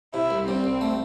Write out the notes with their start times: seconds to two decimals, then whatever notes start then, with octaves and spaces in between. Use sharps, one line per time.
0.14 C3 E4
0.31 C2
0.47 G3 C4
0.64 C2
0.81 A3